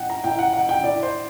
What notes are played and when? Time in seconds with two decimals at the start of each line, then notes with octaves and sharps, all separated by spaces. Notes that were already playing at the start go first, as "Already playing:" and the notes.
Already playing: A2 F#5 G5
0.10 A#5
0.24 A2 G5
0.39 F#5
0.53 F#5
0.69 G5
0.84 A2 D5
1.03 C5